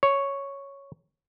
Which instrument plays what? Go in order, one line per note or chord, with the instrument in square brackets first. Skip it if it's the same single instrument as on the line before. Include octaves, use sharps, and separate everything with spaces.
[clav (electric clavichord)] C#5